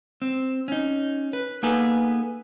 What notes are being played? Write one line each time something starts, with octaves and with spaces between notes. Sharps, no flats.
C4
C#4 D#4
B4
A#3 B3 D#4 G#4 A4 B4